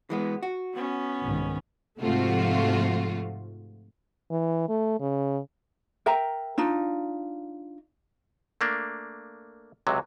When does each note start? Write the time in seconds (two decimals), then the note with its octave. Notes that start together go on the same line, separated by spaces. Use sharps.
0.10 E3 G#3 B3
0.43 F#4
0.75 B3 C#4
1.21 C2 G#2 D#3
2.00 G#2 C3 F3 A3 F4 F#4
4.31 E3
4.69 A3
5.00 C#3
6.06 A#4 E5 G5 A#5
6.58 D4 D#4 F4
8.61 A3 A#3 D4
9.87 C#2 C3 F#3